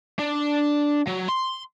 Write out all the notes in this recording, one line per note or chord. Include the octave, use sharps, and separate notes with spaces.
D4
F#3
C6